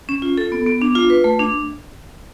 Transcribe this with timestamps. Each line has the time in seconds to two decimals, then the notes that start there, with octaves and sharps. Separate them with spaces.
0.09 C#4
0.22 F4
0.38 A4
0.52 B3
0.67 B3
0.82 D4
0.95 F4
1.10 B4
1.24 A3
1.40 D4